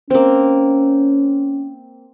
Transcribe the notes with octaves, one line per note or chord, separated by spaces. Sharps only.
A#3 C4 C#4